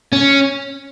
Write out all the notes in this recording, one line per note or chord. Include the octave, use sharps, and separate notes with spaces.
C#4